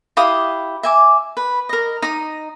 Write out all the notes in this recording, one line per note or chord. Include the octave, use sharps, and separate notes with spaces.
E4 G4 F5 D#6
E5 G#5 D6
B4
A#4 D#5
D#4 D#6